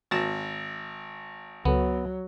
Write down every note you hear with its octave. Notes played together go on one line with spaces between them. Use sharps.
G#1 A6 A#6 E7
C#2 F#3 B3 A4